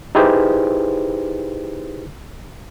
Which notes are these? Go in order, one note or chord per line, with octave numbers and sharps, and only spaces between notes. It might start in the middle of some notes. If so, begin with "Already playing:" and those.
D#4 E4 G4 G#4 B4 C5